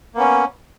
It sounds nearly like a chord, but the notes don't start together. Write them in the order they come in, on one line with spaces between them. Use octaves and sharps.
A#3 B3 C#4